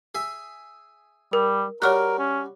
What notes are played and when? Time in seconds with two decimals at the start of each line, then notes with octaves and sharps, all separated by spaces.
0.15 G#4 E5
1.33 G3 A#4
1.82 G3 F#4 A#4 C#5 F6 F#6
2.19 C#4